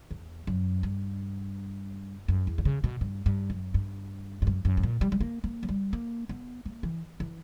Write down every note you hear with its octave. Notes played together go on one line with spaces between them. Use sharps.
E2
F#2
G2
F#2
E2
D3
C#3
B2
G2
G2
F#2
G2
G2
F#2
F#2
G2
A#2
G3
G3
A#3
A#3
F#3
G3
A#3
B3
A#3
E3
E3